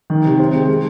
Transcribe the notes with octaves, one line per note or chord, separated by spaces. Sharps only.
D#3
C3
C4
G#3
C3